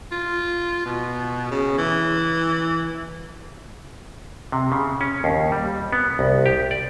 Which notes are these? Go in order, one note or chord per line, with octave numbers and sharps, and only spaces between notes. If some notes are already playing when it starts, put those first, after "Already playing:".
F4
B2
C#3
E3
C3
C#3
C#4
D#2
G3
B3
C2
G4
D5